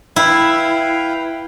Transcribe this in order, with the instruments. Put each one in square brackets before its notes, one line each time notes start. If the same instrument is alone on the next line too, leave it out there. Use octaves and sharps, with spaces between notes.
[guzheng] E4 [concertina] B4 F5 G5